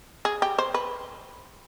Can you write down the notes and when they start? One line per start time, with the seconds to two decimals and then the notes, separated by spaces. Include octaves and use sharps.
0.25 G#4
0.42 G4
0.58 C5
0.74 B4